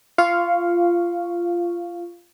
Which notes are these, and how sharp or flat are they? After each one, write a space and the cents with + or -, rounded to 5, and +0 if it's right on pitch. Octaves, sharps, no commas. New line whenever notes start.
F4 -15 F5 +0 C#6 +0